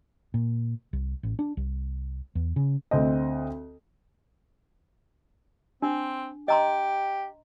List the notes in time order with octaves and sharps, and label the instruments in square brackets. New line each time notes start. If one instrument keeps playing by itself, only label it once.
[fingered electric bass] A#2
C2
A1
D4
C2
E2
C#3
[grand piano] D2 C4 D#5
[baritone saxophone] C4 [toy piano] D4
[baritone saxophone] G4 [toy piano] D#5 A#5 C6